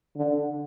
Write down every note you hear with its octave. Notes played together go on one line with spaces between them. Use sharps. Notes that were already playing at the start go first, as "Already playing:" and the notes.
D3